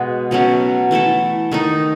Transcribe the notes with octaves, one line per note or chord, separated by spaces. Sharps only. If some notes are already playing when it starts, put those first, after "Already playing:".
Already playing: B2 G#3 B3 G#4
B2 F#3 A3 C#4
E3 A3 E4 A4
D#3 A3 D#4